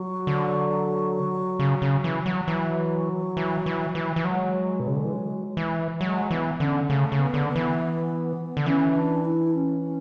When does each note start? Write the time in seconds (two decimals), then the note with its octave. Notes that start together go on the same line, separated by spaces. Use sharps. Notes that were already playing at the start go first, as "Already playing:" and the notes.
Already playing: F#3
0.27 D3
1.59 C#3
1.82 C#3
2.04 E3
2.26 F#3
2.48 E3 F#3
3.37 E3
3.66 E3
3.95 E3
4.16 E3
4.25 F#3 G#3
4.80 B2
4.87 C#3
4.96 D3
5.04 E3
5.13 F#3
5.57 E3
6.01 F#3 G#3
6.30 E3 B3
6.60 D3 C#4
6.89 C#3 A3
7.12 C#3
7.19 B3
7.34 D3
7.49 B3
7.55 E3
8.57 D3
8.66 E3 C#4
8.95 D4
9.24 E4
9.55 C#4